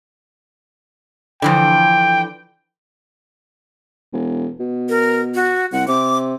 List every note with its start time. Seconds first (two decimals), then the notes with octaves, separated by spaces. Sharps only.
1.42 D3 E3 F3 G5
4.13 E1
4.60 B2
4.89 A#4
5.35 F#4
5.72 C2 F#5
5.88 C3 D6